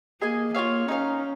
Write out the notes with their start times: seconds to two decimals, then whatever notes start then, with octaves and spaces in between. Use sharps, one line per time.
0.22 A#3 G#4 D#5 G#5
0.55 A#3 F4 G#4 C#5 F5
0.88 C#4 D#4 A#4 F5